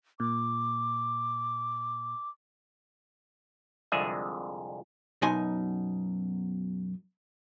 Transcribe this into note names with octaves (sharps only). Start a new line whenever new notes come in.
A#2 D6
C2 F2 D3 G#3 G#4 E5
F#2 B2 B3 D#4 G#5 C6